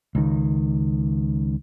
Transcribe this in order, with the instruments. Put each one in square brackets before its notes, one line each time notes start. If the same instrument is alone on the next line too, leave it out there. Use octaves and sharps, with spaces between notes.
[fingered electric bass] C#2 D#3